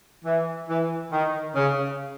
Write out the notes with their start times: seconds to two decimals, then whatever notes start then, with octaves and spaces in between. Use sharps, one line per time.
0.24 E3
0.68 E3
1.11 D#3
1.54 C#3